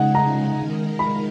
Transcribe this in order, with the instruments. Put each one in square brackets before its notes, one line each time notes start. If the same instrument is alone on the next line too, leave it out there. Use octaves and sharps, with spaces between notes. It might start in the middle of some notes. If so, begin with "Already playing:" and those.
Already playing: [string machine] C#3 G#3 D#4 G#4 [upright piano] F#5
[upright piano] A#5
[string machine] D#3 G#3 D#4 A#4
[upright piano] B5